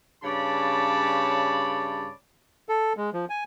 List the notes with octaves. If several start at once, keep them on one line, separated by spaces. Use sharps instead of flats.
G2 C#3 C#5 D5 A5 B5
A4
G#3
F3
G#5